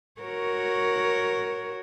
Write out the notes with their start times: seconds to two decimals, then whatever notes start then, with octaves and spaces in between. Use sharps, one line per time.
0.21 F#4 A#4 C#5